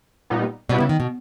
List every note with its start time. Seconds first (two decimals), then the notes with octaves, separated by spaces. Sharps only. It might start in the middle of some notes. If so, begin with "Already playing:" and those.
0.30 A#2 G3 B3 D#4
0.69 B2 G3
0.72 B3 E4
0.80 C#3
0.89 D#3
1.00 B2